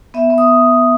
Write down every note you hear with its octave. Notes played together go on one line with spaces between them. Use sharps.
B3 E5
B3
D#6